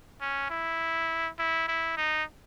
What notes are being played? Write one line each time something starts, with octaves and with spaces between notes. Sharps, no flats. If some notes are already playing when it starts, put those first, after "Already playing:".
C#4
E4
E4
E4
D#4